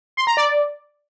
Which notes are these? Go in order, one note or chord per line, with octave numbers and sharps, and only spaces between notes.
C6
A#5
D5